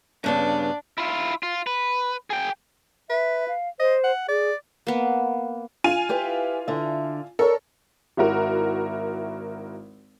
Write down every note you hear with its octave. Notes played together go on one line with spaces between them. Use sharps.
G2 C#3 B3 D4
E4 F4
F4
B4
G#4 G5
B4 E5
F5
C5 D#5
F#5
G#4 D5
A#3 B3
F4 G#5 D#7
E4 G4 B4
D3 E5
A4 A#4 C#5
G#1 E4 F#4 A#4